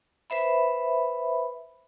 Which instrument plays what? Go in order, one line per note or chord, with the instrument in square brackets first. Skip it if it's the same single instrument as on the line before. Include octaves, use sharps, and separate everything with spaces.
[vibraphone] B4 C5 E5 B5